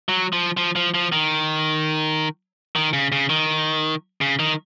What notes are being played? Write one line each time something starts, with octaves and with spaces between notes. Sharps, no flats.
F#3
F3
F3
F3
F3
D#3
D#3
C#3
C#3
D#3
C#3
D#3